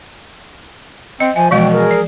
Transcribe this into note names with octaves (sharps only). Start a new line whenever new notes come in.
C4 D#5
F3 E5 G#5
B2 E3 F3 G#3 G5
G#4 A#4
D5